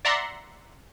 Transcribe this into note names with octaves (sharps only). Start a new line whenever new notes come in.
D5 E5 F#5 A#5 C6